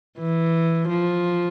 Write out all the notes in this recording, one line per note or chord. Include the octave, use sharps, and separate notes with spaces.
E3
F3